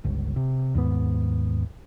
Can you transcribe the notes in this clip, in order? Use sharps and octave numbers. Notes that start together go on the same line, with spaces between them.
G1 C#2
C3
D#2 G#2 B3